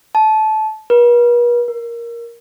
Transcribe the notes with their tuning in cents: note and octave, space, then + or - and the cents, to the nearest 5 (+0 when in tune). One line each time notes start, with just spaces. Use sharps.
A5 -20
B4 -45
A#4 +5